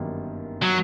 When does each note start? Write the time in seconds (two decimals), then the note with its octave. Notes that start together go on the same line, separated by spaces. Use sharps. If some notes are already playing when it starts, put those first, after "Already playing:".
Already playing: G1 F#2 D#3 G3 A#3
0.62 F#3